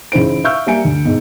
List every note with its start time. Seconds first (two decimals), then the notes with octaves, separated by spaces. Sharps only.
0.12 A1 C#3 D#4 E4 C5 D7
0.44 E5 F5 C#6 E6 F6 G6
0.66 G3 A#3 E5 G#5 C#7 D7
0.85 D2
1.05 G#2 B2